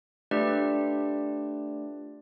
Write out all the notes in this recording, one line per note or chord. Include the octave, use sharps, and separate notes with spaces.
A3 D4 F4 G4 B4 D5